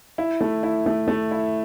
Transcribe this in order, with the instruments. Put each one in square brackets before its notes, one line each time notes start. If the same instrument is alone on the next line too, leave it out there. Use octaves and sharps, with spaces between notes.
[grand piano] E4
A3
E4
A3
A3
E4